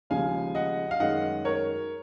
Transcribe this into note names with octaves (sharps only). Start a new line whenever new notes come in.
D#2 C#3 F3 G#3 F5 G#5
D#5 F#5
F5
F#2 D#3 G#3 D#5 F#5
A#4 C#5